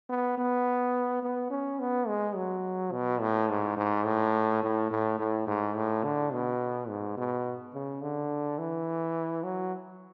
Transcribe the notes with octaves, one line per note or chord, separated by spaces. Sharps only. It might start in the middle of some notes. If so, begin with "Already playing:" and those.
B3
B3
B3
C#4
B3
G#3
F#3
B2
A2
G#2
G#2
A2
A2
A2
A2
G#2
A2
D3
B2
G#2
B2
C#3
D3
E3
F#3